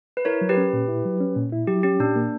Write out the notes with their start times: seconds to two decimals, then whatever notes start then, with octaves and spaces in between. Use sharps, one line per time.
0.17 B4
0.25 E4 A#4 C#5
0.41 F#3
0.49 G4 B4
0.57 C#4
0.73 A#2
0.88 E4
1.05 F#3
1.20 C#4
1.36 A#2
1.52 E4
1.67 F#3 G4
1.83 C#4 G4
2.00 A#2 D4
2.16 A#3